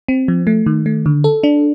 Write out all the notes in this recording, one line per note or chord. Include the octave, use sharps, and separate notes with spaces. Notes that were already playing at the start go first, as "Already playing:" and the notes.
C4
F3
A3
D#3
A3
D3
A4
D4